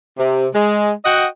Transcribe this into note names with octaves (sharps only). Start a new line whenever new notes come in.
C3
G#3
F#4 D#5 F#5 G5